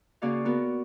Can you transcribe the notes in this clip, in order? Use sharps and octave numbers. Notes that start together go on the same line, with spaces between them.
C#3 A#3 F#4 D5 F5
B3 F#4 A#4